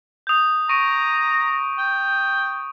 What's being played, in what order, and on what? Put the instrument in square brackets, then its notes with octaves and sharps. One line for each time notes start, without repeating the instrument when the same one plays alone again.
[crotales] D#6 G6
[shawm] A#5 [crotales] C#6 D7
[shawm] G5